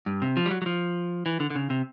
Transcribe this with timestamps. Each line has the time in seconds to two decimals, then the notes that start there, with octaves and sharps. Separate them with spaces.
0.06 G2
0.22 C3
0.37 F3
0.46 G3
0.51 F#3
0.62 F#3
0.66 F3
1.26 E3
1.40 D3
1.50 D3
1.55 C#3
1.70 C3